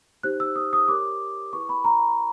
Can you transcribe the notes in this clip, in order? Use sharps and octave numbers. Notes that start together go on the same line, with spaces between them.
D#4 G4 C5 F#6
E6
D#6
D#6
G4 A#4 C#5 D6
E4 G#4 B4 C#6
B5
A#5